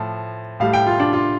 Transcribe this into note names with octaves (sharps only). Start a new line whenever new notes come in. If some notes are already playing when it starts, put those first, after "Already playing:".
Already playing: A2 F3
A2 G3 F5
G5
F4
D4
F4